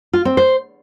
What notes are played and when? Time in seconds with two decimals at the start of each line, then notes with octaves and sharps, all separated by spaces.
0.13 F4
0.25 C4
0.37 C5